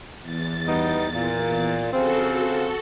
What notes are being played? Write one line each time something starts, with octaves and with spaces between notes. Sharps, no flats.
E2 A6
G3 B3 D#4
A#2
C#3 F3 C4 F#4 A4